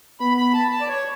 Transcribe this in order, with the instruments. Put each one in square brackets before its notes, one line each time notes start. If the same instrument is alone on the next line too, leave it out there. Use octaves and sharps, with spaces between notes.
[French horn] B3 [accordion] B5
[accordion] B5
A5
A5
D5
C#5